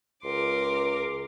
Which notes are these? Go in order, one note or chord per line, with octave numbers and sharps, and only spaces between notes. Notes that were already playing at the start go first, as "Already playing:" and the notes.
C#2 A#4 C6 D6